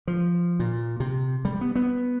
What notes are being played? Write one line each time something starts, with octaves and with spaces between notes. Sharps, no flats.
F3
A#2
C3
G3
B3
B3